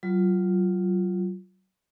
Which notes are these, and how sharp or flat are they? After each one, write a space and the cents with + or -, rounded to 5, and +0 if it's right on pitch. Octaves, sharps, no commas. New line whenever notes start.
F#3 +30 F4 +0